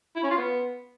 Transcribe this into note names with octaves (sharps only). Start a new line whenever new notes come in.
E4
C#4
F4
B3